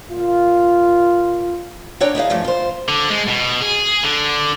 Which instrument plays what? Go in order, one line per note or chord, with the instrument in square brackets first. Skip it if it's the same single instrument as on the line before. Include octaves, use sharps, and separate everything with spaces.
[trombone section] A#2 F4
[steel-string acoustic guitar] C4 D4 C#5 D5 G5 A#5
D#4 E4 G#4 F5
G2 E3 F3 A3 G4
F4 C5
[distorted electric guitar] D3
G#3
B2
G#4
D3